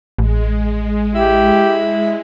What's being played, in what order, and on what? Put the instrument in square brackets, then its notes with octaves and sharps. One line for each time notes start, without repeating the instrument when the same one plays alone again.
[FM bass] A1 [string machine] G#3
[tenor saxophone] E4 [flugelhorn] G4